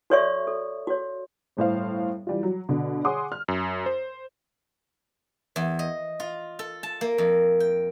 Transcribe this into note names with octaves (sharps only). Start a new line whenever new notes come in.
F#4 A4 C#5 D5 E5 C#6
A4
F#4 C#5
G1 A2 C5 F5
E3 G3 F4
F#3
B2 D3
G#4 C#5 F#5 C6 D6 D#6
F6
F#2
C5
E2
D#5
F4
A4
A5
A#3
F2
G5